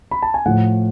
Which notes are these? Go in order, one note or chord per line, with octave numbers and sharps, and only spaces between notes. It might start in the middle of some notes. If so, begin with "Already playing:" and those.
B5
A5
G#5
A2 F3 A3 F#5